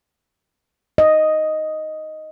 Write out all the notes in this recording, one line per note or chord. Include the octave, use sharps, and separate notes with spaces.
D#5